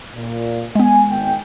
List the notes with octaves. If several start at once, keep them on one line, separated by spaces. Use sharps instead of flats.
A#2
G#3 B3 G#5
G#1 D#3 G5